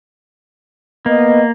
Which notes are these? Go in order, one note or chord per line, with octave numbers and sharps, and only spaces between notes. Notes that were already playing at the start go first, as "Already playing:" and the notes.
A#3 B3 D#5